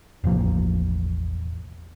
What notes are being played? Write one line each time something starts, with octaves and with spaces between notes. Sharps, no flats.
E1 A1 F3 A#3